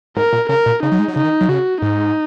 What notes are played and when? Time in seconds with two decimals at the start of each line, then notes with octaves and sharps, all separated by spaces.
0.17 G#2 A#4
0.33 A#2
0.49 C#3 A#4
0.66 A#2
0.83 C#3 D#4
0.92 F#3
0.99 G#3
1.08 F#3
1.16 C#3 D#4
1.24 D#3
1.41 F#3
1.48 C#3 F#4
1.82 G#2 D#4